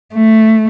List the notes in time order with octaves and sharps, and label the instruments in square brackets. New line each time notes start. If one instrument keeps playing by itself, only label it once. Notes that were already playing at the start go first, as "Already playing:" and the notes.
[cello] A3